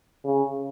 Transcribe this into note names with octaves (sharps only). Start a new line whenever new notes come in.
C#3